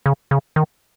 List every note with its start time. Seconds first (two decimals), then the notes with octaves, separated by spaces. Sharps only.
0.06 C#3
0.31 C#3
0.56 D#3